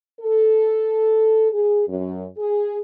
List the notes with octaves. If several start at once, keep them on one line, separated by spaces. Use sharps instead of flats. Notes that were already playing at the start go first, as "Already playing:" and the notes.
A4
G#4
F#2
G#4